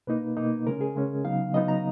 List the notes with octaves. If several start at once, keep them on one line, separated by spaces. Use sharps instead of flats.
B2 A#3 D#4 B4
B2 A#3 D#4
C#3 G#3 C#4 A#4
G#4
C#3 G#3 C#4
C#3 F#3 B3 D#4 F5
C#3 F#3 B3 D#4 D#5
A#5